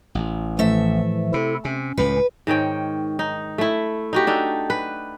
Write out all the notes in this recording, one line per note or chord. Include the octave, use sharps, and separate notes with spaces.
A1
A2 E3 F3 A3 E5
C3 E4 A4
C3 C#4
C#2 A2 B4
G#2 D#3 C#5 G5
D#4
A3 E4
D#4 F#4 G4
D4 D#4 A4
B4